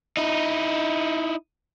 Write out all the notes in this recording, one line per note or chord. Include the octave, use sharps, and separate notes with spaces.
D#4 E4